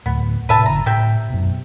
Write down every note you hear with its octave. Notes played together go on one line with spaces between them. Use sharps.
D2 A2 B3
A2 C3 B4 E5 A5
F#1 A#2 D3 A#5
A2 C3 E5 G5
F#2 B2